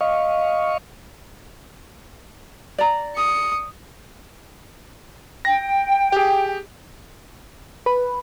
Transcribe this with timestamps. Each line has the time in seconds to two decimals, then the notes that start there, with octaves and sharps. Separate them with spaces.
0.01 D#5 F5 C#6
2.78 D5 A#5
3.15 D#6 C#7
5.45 G5 A#6
6.12 G4 G#4
7.86 B4